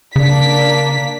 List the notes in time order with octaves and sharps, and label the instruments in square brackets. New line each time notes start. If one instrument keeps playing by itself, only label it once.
[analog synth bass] C#3 [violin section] A#3 D4 B6